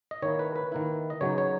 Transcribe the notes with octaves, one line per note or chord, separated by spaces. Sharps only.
D#5
D#3 A#3 E4 C#5
B4
B4
D#3 A#3 E4
D#5
C#3 F#3 B3 D#4 C#5
C#5